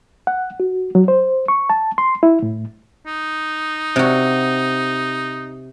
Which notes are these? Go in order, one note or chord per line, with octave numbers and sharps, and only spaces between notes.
F#5
F#4
F#3
C5
C#6
A5
C6
E4
A2
D#4
C3 F#4